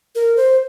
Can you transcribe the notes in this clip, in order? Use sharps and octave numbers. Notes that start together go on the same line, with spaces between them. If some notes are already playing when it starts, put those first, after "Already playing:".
A#4
C5